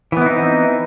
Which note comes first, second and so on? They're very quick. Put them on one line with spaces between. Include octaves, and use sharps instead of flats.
E3 B3 E4 D#4 C4